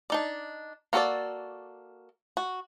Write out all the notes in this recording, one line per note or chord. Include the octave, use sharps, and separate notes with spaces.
D4 D#4 D5
A#3 F#4 A4 A#4 D5
F#4